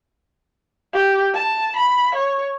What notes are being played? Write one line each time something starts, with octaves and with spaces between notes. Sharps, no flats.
G4
A5
B5
C#5